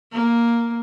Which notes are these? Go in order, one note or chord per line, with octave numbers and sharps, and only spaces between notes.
A#3